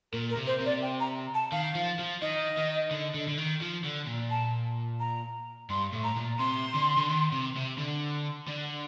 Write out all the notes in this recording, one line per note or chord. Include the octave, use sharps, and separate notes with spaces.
A#2 A#4
A#4
C3
C5
C3
D5
G5
A#5
A5
D#3 F5
F3
F3
D#3 D#5
D#3
D3
D3
D3
D#3
F3
D3
A#2
A5
A#5
G2 C6
A2
A#5
A#2
C3 C6
D3
D3
D#3
C3
C3
D3
D3